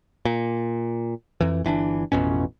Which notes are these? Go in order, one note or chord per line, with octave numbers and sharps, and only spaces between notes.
A#2
F2 E3
G1 E3 C#4 D4
A1 F2 B2 C#4